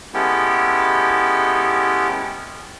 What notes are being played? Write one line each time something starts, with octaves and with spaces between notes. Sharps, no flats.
G#3 B3 C#4 E4 G4 A4